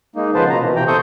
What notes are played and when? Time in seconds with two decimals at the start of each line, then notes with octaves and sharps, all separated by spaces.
0.16 G#3 A#3 D#4
0.35 C#3 F3 B3 B4 C5 A5
0.50 B2 A#3 A#5
0.62 B2 E3
0.76 C3 G5 A#5
0.88 A4 C5 C#6 D#6 G6